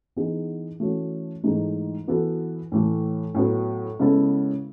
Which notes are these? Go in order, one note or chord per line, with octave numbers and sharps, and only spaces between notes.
E3 B3 D#4 G#4
E3 A3 C#4 F#4
G#2 E3 A3 D#4 G#4
E3 B3 F#4 A4
A2 E3 A3
A2 F#3 B3
C#3 G#3 B3 E4 A4